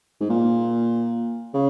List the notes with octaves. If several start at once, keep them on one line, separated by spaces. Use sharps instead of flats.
G#2
A#2
C#3